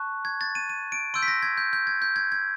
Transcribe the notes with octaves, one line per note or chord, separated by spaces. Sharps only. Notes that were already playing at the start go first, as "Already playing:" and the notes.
Already playing: A5 C#6 F#6
G#6
A6
D#7
D#7
D7
C6 E6 G6 D7
B6
A#6
G#6
G6
G6
G#6
G6
G#6
G#6